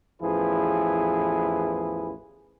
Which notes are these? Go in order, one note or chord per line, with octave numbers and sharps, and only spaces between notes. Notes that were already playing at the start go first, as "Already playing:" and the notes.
A1 E2 F3 E4 G#4 B4